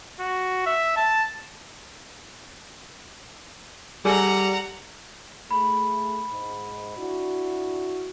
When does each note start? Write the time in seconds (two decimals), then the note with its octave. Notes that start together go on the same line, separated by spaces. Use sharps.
0.20 F#4
0.66 E5
0.97 A5
4.05 G3 G#4 A4 F#5 A#5
5.51 A3 G#4 B5
6.29 G#2
6.97 D4 E4 F#4